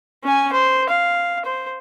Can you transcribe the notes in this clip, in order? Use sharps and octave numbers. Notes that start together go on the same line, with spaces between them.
C#4 G#5
C5
F5
C5